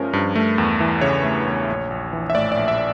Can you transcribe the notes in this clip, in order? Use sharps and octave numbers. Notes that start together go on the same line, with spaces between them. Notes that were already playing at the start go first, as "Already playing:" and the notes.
Already playing: G2 F3 A3 C#4 A#4
G2
A3
E2
E3
C#3 C#5
A3
E2
A#1
A#1
E3
E5
A2 D5
D5
A#1
E5